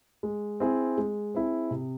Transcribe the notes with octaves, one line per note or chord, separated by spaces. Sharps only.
G#3
C4 E4 G#4
G#3
C4 E4 G#4
C3